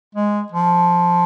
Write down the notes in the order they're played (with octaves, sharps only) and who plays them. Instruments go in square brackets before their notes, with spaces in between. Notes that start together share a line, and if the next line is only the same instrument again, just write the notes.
[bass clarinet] G#3
F3